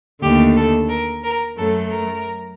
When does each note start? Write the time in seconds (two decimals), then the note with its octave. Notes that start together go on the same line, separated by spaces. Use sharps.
0.21 D#2 D3 A3 G4
0.56 A4
0.89 A#4
1.23 A#4
1.56 F#2 F#3 A3 A4
1.90 A#4